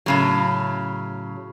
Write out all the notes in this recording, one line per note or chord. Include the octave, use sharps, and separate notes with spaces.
A2 C#3 F#3